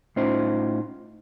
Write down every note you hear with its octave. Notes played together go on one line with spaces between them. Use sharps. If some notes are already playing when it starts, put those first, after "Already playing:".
A2 C#4 D#4 F4 C5